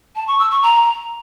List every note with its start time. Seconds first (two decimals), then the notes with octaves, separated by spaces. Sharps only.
0.16 A5
0.27 C#6
0.39 E6
0.51 C#6
0.63 A#5